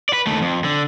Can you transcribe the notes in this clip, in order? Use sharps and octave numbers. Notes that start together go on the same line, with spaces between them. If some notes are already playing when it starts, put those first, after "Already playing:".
B4 D5
D#2 A3
F2
D3